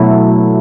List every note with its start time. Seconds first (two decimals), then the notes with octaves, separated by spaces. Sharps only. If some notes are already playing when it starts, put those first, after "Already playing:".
Already playing: B2 F#3 A3 E4